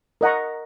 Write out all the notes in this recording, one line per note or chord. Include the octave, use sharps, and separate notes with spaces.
A#4 D#5 F#5 A#5 C#6